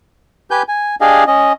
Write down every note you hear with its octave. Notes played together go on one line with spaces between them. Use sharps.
G4 B4 G#5 G6
G#5
D4 G4 G#4 D#5 F5 G#5
C#4 D#5